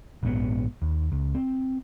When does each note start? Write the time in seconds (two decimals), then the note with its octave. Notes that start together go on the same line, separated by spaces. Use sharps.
0.23 A#1 G#2 B2 B3
0.82 D#2
1.12 C#2
1.35 C4